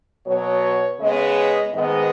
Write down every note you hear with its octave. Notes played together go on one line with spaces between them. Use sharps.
B2 F#3 B3 C#5
C#3 G#3 B3 D#5
G#2 D#3 G#3 B3 D#5